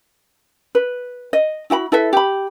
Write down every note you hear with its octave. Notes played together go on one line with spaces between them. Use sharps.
B4
D#5
E4 F#4 G5 B5
E4 A4 B4 E5
G4 B5